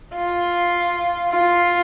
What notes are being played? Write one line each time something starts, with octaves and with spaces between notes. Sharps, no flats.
F4
F4